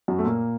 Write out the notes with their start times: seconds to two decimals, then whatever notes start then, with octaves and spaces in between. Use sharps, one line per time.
0.08 F#2 F#3
0.19 A3
0.25 A#2 A#3